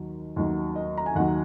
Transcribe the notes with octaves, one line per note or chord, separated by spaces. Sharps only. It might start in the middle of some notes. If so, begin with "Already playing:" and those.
Already playing: D#2 D#3 F#3
D#2 D#3 F#3
D#5
A#5
G#5
D#2 D#3 F#3 F#5